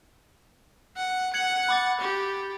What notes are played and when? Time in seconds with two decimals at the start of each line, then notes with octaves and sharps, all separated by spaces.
0.97 F#5
1.34 F#5 G#6 C#7 F#7
1.69 B5 D6 A6
2.01 G4